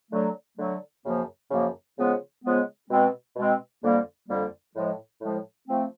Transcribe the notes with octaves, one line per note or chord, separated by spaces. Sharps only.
D3 F#3 A3
D3 F#3 A3
F#2 C#3 F3 A#3
F#2 C#3 F3 A#3
C#3 F3 G#3 B3
C#3 F3 G#3 B3
B2 G#3 C4
B2 G#3 C4
F2 D3 G3 A#3
F2 D3 G3 A#3
A2 F3 G#3
A2 F3 G#3
F3 A3 C4